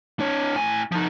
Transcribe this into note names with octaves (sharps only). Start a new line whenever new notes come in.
D4 C#5
A2 G#5
F3 D#4